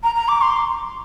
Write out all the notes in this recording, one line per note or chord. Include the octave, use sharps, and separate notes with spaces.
A#5
A#5
D6
C6